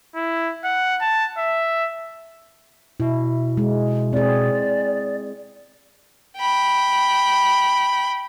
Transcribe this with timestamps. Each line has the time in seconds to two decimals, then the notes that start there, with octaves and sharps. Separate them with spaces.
0.16 E4
0.65 F#5
1.01 A5
1.38 E5
3.00 B2 E4
3.57 G#3
4.13 C4 G#4 D5
6.37 G5 B5